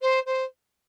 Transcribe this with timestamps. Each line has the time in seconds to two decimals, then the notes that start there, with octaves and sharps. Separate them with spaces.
0.01 C5
0.26 C5